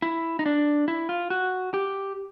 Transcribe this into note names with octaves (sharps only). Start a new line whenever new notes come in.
E4
D#4
D4
E4
F4
F#4
G4